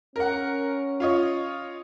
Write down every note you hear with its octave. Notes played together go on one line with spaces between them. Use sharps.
C#4 A#4 F#5
F4 C#5 D#5